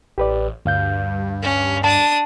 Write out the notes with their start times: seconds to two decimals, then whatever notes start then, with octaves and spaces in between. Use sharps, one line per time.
0.18 A1 G4 B4 D5
0.65 D2 G2 F5 G6
1.43 C#4
1.84 D4 A5 D#6